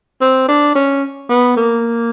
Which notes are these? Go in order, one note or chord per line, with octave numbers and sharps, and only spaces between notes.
C4
D4
C#4
B3
A#3